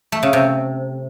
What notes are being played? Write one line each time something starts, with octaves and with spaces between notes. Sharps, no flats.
A3
C#3
C3